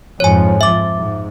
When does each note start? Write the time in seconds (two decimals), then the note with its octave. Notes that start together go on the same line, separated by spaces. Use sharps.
0.20 F2 G#2 F3 C#5 G#5
0.61 E5 D6
0.96 G#2